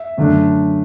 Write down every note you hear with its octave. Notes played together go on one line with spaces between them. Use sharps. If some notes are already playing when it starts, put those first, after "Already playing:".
Already playing: E5
F#2 D3 A3 D4